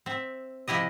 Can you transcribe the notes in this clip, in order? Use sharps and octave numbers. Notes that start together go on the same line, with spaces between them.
C4 E5
C3 F3 E4 G4 D#5